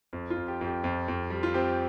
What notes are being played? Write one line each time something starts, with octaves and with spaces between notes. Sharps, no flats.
F2
F4
F2
G4
F2
G4
F2
F2
G3
F4
C4 G4